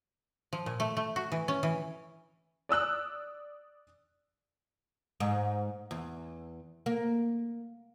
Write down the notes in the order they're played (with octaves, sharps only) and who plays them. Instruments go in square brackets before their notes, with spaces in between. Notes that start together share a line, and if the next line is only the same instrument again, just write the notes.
[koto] F3
A#2
A3
A3
F#4
E3
C#4
E3
[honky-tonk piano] D5 D#6 E6 F#6
[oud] G#2
E2
A#3